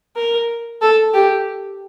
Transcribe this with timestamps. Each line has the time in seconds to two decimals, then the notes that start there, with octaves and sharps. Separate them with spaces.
0.16 A#4
0.82 A4
1.14 G4